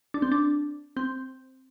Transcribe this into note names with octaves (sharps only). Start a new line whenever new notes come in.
D4
C4
D4
C4